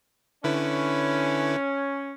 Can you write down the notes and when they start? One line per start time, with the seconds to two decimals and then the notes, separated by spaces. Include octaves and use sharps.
0.44 D3 C#4 E4 B4